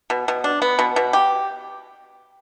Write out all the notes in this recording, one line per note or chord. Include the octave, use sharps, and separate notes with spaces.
B2
B2
D4
B3
B2
B2
G4